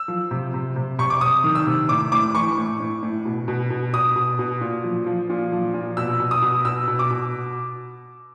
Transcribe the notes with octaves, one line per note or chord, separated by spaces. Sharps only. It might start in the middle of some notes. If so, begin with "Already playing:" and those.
Already playing: E6
F3
C3
C3
C3
C3 C#6
D6
C3 D#6
D#3
E6
C3
A2 D6
A2 D6
E3 C#6
A2
A2
A2
B2
B2
B2
B2 D#6
B2
B2
A#2
F3
F3
A#2
F3
A#2
B2 E6
B2
D#6
B2
B2 E6
B2
D6
B2